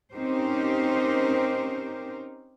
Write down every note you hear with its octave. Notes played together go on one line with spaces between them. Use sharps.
C4 C#4 D#4 G4 A#4 C5